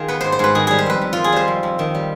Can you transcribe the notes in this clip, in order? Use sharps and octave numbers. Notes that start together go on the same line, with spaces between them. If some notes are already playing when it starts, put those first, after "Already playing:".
Already playing: D#3 F4 G#4
B3 B4
G#2 C5
C5
G#2 B4
D#3 G#4
G3 G#4
C5
F2 B4
F2
D#3 F4
G#4
G3 C5
F2
F2
D#3
G3